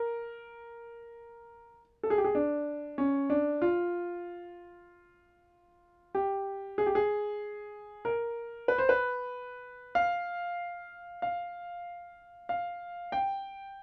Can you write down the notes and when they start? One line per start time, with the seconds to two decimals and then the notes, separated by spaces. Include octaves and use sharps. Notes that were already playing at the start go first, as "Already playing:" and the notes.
Already playing: A#4
2.03 A4
2.10 G#4
2.18 G4
2.24 G#4
2.35 D4
2.98 C#4
3.30 D4
3.62 F4
6.15 G4
6.78 G#4
6.86 G4
6.95 G#4
8.05 A#4
8.68 B4
8.78 C5
8.89 B4
9.95 F5
11.22 F5
12.49 F5
13.12 G5